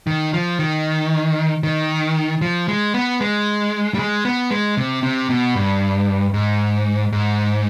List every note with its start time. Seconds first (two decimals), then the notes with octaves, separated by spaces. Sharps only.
0.07 D#3
0.33 F3
0.59 D#3
1.63 D#3
2.42 F3
2.68 G#3
2.94 B3
3.21 G#3
3.94 G3
3.99 G#3
4.25 B3
4.51 G#3
4.77 C3
5.03 C3
5.30 B2
5.56 G2
6.34 G#2
7.12 G#2